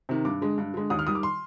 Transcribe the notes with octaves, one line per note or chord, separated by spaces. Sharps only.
C3 D#3
G2 D6
D3 G#3
G2
D3 G#3
D#2 D#6
F6
D#3 G3 D#6
D6
C6